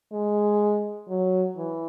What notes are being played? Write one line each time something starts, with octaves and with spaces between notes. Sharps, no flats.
G#3
F#3
E3